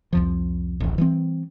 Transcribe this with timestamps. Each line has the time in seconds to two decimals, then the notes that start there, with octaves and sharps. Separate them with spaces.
0.13 C2 F2 F3
0.80 D1 A1
0.98 E3 G3 C4